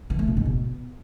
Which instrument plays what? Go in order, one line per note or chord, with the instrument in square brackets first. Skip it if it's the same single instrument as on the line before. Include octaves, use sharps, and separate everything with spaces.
[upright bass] E3
A3
A#2
G#2
B2